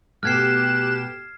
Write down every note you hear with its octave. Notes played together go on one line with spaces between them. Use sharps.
B2 A3 G4 F6 F#6 G#6 C7 E7